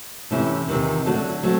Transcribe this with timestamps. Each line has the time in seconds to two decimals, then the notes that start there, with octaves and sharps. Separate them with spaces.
0.31 C3 E3 A3 C#4 E4
0.68 E2 C3 D#3
1.05 D3 F#3 A3 D4 F#4
1.43 F#3 A3 C4